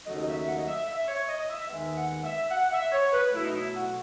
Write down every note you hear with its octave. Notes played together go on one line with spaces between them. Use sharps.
D#2 C#3 F#3 A3 D#5
D#5
E5
F#5
D#5
E5
E5
C#5
D#5
E5
D#2 D#3 G#3 B3 E5
F#5
E5
F#5
E5
C#5
B4
B2 F#3 A3 E4
D#4
E4
F#4